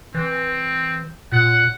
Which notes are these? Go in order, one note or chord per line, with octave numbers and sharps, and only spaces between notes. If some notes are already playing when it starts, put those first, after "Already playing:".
E3 C4
A#2 F#5